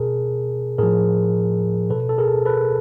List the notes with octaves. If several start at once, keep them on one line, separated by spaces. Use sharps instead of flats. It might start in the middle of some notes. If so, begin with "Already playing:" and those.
Already playing: B2 G#4 A#4
A2 F3 G#4 A#4
B2 A4 B4
A4
G#4 A#4
A4 B4